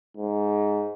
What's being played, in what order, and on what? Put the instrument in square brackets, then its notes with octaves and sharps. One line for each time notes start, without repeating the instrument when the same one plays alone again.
[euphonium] G#2